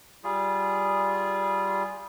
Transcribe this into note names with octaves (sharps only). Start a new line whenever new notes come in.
G3 F4 G#4